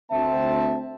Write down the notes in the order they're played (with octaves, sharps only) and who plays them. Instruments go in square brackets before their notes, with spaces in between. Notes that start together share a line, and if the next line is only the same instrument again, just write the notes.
[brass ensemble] D2 C4 E5 A5